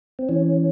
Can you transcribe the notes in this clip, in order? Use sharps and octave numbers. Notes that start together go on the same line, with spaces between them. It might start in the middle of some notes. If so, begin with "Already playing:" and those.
C4
E3 C#4